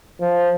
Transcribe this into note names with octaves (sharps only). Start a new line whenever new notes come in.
F3